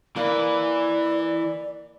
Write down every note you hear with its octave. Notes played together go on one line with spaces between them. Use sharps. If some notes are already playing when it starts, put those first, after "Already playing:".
E3 A#3 B4 D5